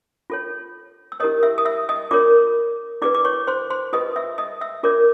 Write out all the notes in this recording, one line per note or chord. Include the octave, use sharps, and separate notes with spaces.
F4 A4 C#5
E6
E4 G4 A#4 C#5 D#5 D#6
E5 E6
D#6
E5 E6
D#5 D#6
F4 A#4 C#5 D5 D6
E4 G#4 B4 D5 D6
D6
C#5 C#6
C5 C6
C5 C6
F4 G#4 B4 D#5 D#6
E5 E6
D#5 D#6
E5 E6
F4 A#4 C#5 D5 D6